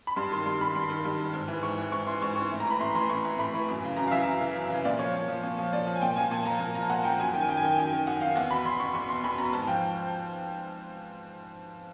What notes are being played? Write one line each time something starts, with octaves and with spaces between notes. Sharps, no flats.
B5
G2 C6
D#3 C6
G2 C6
D#3 B5
G2 C6
D#3
G2
D#3
G#2
E3
G#2 C#6
E3
G#2 C#6
E3 C6
G#2 C#6
E3 C#6
A2
A#5
E3
B5
A2 C6
E3 C6
A2 C#6
E3
A2 B5
E3
F#2
C#3 E3
F#2 A#5
F5
C#3 E3 E5
F#2
C#3 E3
F#2
C#3 E3
A#2 D5
F3 C#5
A#2
F3
A#2
F3
A#2 D5
F3
G#5
A#2 G5
F3 G#5
A#2 A5
F3 A#5
A#2
F3 A#5
A#2 F#5
F3 G5
F#2 G#5
D#3 G5
G#5
F#2 G5
G#5
D#3 G5
G#5
F#2 G5
D#3
F#2 F#5
D#3 F5
E2 F#5
B2 B5
E2 C6
B2 C#6
E2 C#6
B2 C6
E2 B5
B2 A#5
G#2 A5
F3 G5